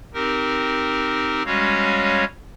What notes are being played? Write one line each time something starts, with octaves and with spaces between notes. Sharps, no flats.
C4 D#4 G4 A#4
G3 G#3 C#4 F#4 C#5 F5